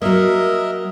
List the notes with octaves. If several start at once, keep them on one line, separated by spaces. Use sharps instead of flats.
F#3 A#3 A#4 D#5 E5